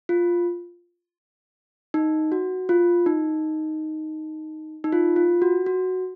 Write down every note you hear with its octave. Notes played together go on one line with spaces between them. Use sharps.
F4
D#4
F#4
F4
D#4
D#4
F4
F4
F#4
F#4